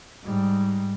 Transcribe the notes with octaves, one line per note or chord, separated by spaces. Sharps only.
G#2 G3